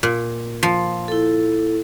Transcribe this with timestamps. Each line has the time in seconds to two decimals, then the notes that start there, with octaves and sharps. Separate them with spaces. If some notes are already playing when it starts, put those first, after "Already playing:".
0.03 A#2
0.63 F3
1.08 E4 A4